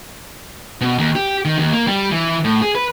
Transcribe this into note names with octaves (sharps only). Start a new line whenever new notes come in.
B2
D#2
G4
D#3
D#2
A#3
G3
E3
A2
G#4
B4